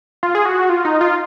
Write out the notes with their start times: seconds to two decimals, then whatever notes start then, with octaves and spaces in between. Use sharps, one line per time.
0.23 F4
0.35 G#4
0.46 F#4
0.69 F4
0.85 D#4
1.01 F4